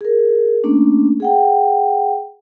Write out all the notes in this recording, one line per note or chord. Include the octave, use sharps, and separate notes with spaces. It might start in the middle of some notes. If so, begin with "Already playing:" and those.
G#4 A#4
A3 A#3 C#4 D4
G#4 F#5 G5